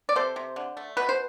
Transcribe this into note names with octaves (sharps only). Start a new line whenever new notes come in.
D5
C3 A4 C5
C3
D3
A3
B2 B4
C5